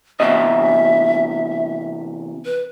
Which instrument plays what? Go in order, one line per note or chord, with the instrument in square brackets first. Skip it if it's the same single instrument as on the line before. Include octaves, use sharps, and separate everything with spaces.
[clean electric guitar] E2 C3 D#5 [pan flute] E5
[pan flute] B4